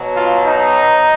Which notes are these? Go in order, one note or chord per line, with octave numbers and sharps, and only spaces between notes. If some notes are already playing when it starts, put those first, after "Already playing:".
Already playing: B2 F#3
F4
D#4